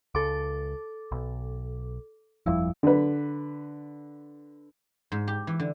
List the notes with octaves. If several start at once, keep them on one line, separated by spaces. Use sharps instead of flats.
C#2 A4 D6
B1
G1 F2 F3 G3 E4
D3 B4
G#2
G4
E3
D3